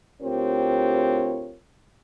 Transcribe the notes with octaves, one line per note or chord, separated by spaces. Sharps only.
D2 C4 F4 G4 A#4 C#5